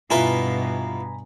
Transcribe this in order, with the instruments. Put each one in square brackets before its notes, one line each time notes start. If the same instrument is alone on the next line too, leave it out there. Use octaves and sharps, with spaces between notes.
[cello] G2 B2 [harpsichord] E4 F4 B4 [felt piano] G#5 A#5 B5